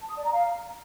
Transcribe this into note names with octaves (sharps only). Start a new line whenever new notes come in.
A5
D#6
D5
A#5
F5